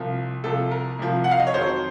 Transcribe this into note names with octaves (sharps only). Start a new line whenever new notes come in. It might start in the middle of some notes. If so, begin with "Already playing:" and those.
Already playing: C2 C3 F3
C2 C3 F3 A4
A#4
C2 C3 F3
F#5
F5
D#5
C#5
F2 D#3 F#3 C5